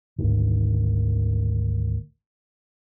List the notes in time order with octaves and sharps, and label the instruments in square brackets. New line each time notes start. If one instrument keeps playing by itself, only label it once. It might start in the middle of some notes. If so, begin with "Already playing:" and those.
[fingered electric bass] G#1 D2 D#3